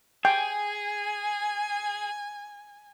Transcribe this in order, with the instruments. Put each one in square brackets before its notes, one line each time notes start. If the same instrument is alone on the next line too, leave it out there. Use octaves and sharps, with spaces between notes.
[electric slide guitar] G#4 [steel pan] G5 [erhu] G#5